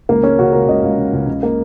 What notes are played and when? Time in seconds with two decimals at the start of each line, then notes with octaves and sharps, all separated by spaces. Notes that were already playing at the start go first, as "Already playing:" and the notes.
0.09 C#2 A#3
0.23 G#3 C#4
0.39 C#3 F#4
0.53 C#2 A#4
0.68 C#2 D#5
0.83 C#2
0.98 C#3
1.13 C#2
1.27 C#3
1.43 A#3